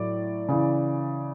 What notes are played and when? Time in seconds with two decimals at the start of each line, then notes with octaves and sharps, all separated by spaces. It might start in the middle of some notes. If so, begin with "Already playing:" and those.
Already playing: A2 F#3 D5
0.49 C#3 E3